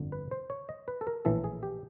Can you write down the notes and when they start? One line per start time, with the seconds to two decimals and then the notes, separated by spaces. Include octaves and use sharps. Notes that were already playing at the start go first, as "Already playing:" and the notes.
Already playing: G1 F2 D3
0.12 B4
0.31 C5
0.50 C#5
0.69 D#5
0.88 B4
1.01 A4
1.07 A#4
1.25 A#1 A2 E3 A4
1.44 G#4
1.63 G4